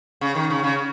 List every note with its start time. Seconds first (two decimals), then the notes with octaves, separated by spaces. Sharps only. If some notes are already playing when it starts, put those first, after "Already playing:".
0.21 C#3
0.35 D#3
0.50 C#3
0.64 C#3